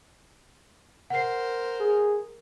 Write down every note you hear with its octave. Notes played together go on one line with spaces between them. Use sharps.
A#4 C5 F#5 C7
G#4